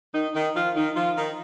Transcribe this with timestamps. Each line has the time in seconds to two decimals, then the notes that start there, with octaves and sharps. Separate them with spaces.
0.14 D#3 D#4
0.34 D#3 D#4
0.55 F3 F4
0.75 D#3 D#4
0.95 F3 F4
1.16 D#3 D#4